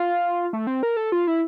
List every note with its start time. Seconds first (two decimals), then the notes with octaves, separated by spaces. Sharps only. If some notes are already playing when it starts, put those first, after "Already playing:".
Already playing: F4
0.53 A3
0.67 C4
0.83 A#4
0.97 A4
1.12 F4
1.27 E4